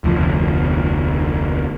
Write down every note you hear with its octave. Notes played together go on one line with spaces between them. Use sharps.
F1 D2 F3